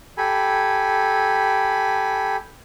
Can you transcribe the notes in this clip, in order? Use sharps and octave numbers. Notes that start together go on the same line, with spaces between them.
G4 A4 G#5 B5